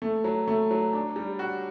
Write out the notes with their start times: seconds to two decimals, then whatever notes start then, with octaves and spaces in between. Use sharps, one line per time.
0.02 A3
0.24 F#3
0.48 A3
0.71 F#3
0.93 D4
1.16 G3
1.39 F#4